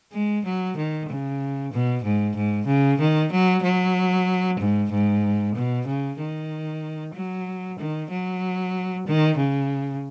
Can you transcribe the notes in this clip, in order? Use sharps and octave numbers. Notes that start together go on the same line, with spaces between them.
G#3
F#3
D#3
C#3
B2
G#2
G#2
C#3
D#3
F#3
F#3
G#2
G#2
B2
C#3
D#3
F#3
D#3
F#3
D#3
C#3